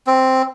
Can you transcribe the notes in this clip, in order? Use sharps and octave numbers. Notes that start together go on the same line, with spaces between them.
C4